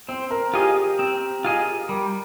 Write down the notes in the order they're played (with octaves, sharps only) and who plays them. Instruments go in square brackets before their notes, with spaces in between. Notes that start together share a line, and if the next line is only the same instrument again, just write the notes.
[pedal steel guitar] C4 [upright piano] C5
[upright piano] A#4
[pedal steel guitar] F4 G#4 D#5 [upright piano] G4
[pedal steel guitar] C4
F4 G#4 D#5
[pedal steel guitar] G3 [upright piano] A#4